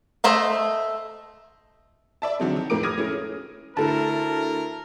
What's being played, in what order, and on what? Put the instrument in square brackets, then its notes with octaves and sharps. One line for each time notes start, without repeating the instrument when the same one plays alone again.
[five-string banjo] A3 C5 D#5 E5
[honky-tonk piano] D5 E5 A5
D3 D#3 F#3 G#3 C4
D#3
F2 A2 G#3 A#4 D6 D7
D6 D#6 F6 G#6 A#6 D#7
A3 C#4 E4 G#4
[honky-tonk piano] D2 A4 [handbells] E4 A5 [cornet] A#4